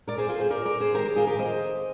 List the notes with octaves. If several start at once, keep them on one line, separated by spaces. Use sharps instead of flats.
A#2 G#3 A#4 D5
G#4 C5
F4 G#4
G#4 C5
A#4 D5
A#4 D5
G#4 C5
F2 D#3 G#3 G4 A#4
F4 G#4
G4 A#4
C5 D#5